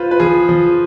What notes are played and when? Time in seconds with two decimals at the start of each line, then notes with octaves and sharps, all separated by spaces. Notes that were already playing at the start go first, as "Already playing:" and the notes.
Already playing: F4 B4 C5
0.11 B4
0.20 F3 G#4
0.49 F3